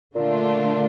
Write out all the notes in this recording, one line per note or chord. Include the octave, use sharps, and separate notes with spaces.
A#2 D3 A3 D4 F4